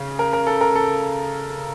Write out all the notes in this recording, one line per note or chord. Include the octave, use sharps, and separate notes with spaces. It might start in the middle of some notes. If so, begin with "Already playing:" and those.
Already playing: C#3
A#4
A#4
A4
A#4
A4